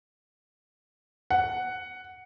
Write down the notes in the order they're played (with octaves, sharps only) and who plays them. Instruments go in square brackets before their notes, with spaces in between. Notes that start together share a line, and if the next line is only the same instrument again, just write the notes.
[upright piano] F#5